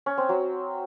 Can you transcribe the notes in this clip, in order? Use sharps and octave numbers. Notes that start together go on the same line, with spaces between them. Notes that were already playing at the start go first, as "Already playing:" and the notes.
C#4
C4
F#3